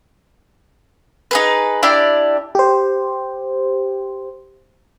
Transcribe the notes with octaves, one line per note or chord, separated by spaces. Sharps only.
D#4 G#4 B4
D4 E4 G4 D5
G4 C5